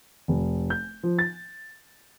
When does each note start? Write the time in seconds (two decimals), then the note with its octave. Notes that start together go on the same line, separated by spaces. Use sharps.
0.28 F1
0.70 G6
1.03 F3
1.19 A6